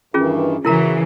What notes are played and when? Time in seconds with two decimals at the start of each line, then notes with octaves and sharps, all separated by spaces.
0.14 G2 D#3 E3 C#4 F4 G#4
0.65 C#3 E3 F#3 E4 A#4 A#5